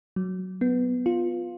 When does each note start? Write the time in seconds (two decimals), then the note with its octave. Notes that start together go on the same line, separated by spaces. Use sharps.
0.16 F#3
0.61 B3
1.06 F4